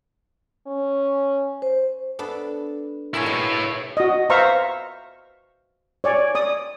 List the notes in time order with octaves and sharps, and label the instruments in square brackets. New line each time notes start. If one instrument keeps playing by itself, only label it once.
[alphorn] C#4
[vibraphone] C5
[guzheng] B3 D4 A4
[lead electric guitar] E4 C#5 [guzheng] F4 G#4 A#4
[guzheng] B2
[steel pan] F#4 D#5
B4 C5 E5 F5 A#5 C#6
C#5 D5 G#5
D5 D#6